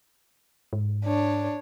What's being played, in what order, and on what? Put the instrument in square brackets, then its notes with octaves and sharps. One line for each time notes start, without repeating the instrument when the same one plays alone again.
[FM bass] G#2
[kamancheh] D4 C#5